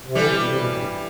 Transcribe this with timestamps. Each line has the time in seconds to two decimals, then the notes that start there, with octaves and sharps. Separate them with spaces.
0.06 C3
0.15 D3 E3 G3
0.26 C3
0.36 B2
0.47 C3
0.57 B2
0.68 A2
0.78 G2